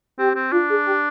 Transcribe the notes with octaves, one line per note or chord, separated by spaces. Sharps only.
C4 G4
C4
D4 F4
G#4
G4